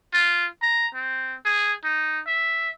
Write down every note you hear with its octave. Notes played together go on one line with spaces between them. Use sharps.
F4
A#5
C4
G#4
D#4
E5